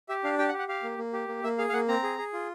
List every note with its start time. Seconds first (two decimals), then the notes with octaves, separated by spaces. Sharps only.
0.09 G4 E5
0.24 D4 F5
0.38 G4 G5
0.49 F#5
0.53 G4
0.59 F#5
0.69 G4 F5
0.83 A#3
0.98 A#3
1.13 G4
1.28 A#3
1.43 A#3 E5
1.58 G#4 F5
1.69 F5
1.73 A#3 F#5
1.88 C4 A#5
2.03 G#4
2.18 G#4
2.33 F4